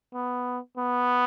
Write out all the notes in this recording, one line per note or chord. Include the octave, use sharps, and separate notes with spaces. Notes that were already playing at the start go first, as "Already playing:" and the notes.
B3
B3